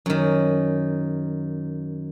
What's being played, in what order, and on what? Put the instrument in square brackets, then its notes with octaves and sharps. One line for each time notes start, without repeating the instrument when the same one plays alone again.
[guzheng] F#2 D#3